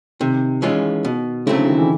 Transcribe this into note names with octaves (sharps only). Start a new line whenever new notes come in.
C3 D#3
E3 G#3 C#4 F4
B2
C#3 F#3 A3 C4 E4
D3
D#3
E3